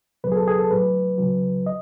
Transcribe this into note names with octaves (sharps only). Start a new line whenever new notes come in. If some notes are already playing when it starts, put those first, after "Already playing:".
C#2 B2 F#3 B4
G#4
A4
G#4
A4
A2 F#3 B4
C#2 C#3 F#3
D#5